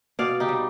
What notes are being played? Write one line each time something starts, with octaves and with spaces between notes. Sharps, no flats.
B2 D5 F5
D#4 G4
G3